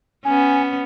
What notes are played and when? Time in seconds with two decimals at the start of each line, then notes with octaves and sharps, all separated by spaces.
0.25 B3 C#4 G#5